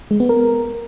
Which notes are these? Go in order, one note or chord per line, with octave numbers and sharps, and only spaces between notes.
G#3
B3
A#4